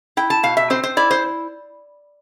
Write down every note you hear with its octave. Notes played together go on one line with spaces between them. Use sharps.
E4 G5
A5
B2 F5
E5
C4 C5
C5
E4 D5
C5